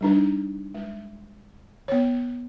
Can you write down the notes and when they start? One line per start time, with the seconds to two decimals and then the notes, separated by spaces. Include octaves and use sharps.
0.01 G3 D4 D#4
0.74 G#3
1.88 B3 C#5